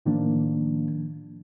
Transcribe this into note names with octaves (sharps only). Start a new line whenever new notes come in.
A2 D#3 F3 A#3 D4